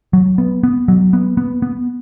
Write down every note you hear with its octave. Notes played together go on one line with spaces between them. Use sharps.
F#3
B3
B3
F#3
B3
B3
B3